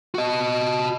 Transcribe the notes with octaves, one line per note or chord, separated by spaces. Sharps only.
F#4 D#5